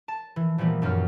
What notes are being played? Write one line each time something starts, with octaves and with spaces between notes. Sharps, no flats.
A5
E3
A#2 E3 F3 G3 A#3 B3
D#1 F#2 A#3 F6